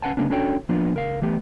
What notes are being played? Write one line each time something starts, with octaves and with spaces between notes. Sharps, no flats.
C#4 B4 F5 F#5 G#5 A5
C#3 A#3 B3 C#4 D4
C#4 D4 F#4 A4 C#5 G5
F3 A#3 B3 D4 F4
C#2 A#4 F5
E3 A3 B3 G4